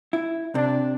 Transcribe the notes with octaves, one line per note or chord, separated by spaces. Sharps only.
E4
C3 D4